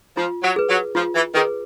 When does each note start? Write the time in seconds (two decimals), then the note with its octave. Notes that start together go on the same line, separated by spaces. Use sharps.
0.17 F3 F4
0.43 F#3
0.56 G#4 B4
0.69 F#3
0.95 F3 F4
1.15 E3
1.34 D#3 G#4 B4